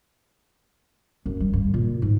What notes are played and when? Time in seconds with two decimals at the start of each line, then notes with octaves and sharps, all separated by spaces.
1.26 F#2
1.40 G3
1.53 G2
1.74 A#2
2.02 G#2